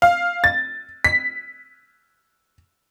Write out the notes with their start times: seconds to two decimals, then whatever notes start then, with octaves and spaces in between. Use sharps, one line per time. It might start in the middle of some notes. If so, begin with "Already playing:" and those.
0.02 F5
0.44 A6
1.04 B6